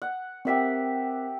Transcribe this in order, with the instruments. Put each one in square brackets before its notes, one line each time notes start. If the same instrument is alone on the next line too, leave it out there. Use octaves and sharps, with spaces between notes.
[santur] F#5
[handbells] C4 A#4 B6 [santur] G4 E5 F#5